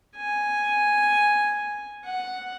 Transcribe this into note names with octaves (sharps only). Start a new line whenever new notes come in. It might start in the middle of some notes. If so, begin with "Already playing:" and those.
G#5
F#5